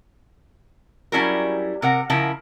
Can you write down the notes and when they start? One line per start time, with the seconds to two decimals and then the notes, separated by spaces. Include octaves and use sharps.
1.12 F#3 G3 C#4 E4 G#4 A#4
1.82 C3 A#4 F#5
2.10 C#3 F3 E4 A#4